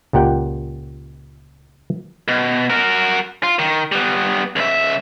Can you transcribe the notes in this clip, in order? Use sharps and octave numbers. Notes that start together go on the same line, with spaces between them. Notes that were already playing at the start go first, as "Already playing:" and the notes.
C#2 A#2 G4 F#5 G5
B2
F#4 A#4
F4
D#3
G3 B3
C#2 E5